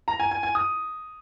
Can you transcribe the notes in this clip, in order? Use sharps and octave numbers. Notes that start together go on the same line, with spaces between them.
A#5
G#5
G#5
G#5
D#6